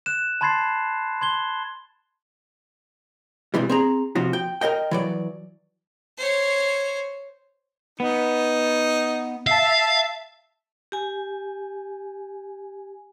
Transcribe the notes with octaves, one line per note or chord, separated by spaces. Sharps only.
F#6 E7
A5 B5 C6 G#6 A6 C7
C6 G#6 G7
G#2 C3 E3 G3
C4 G#4 A#5
C3 F3 F4 F#4
G5
A#4 C5 D#5 G5
E3 F#3 D5
C5 C#5
B3 D#4
E5 F5 A5
G4 G#5